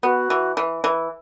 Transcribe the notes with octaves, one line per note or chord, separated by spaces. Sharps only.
B3 F#4
E3
E3
E3